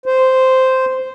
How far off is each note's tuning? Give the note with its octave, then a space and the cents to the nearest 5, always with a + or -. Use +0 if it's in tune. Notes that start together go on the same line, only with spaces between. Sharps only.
C5 -5